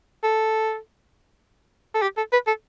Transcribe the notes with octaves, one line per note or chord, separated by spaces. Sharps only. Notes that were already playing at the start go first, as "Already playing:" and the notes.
A4
A4
G4
A4
B4
A4